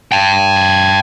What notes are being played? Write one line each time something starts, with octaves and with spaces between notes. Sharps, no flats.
G5 A5